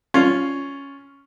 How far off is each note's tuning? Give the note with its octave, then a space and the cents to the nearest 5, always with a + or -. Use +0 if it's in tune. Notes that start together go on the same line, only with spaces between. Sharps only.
C#4 +0 F4 +0